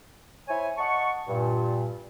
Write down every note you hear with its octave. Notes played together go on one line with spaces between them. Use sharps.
E4 C5 C#5 G#5
D#5 F#5 A5 C#6
G2 A#2